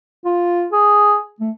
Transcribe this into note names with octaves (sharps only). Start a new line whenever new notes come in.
F4
G#4
A3